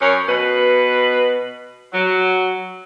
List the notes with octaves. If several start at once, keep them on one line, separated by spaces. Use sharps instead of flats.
F#2 C#4 A#4 C#5
B2 B4
F#3